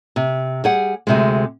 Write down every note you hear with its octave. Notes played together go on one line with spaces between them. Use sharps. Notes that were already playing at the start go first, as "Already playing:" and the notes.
C3
G3 G#4 F#5
D2 C3 G#3